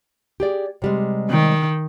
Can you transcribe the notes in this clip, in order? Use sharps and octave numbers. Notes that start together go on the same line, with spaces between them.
G4 G#4 D5
C3 G3 G#3
D#3